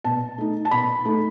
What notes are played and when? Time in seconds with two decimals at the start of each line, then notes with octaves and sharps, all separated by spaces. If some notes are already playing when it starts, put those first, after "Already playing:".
0.04 B2 A5
0.38 A3 D#4
0.65 A5
0.71 B2 B5
1.05 A3 D#4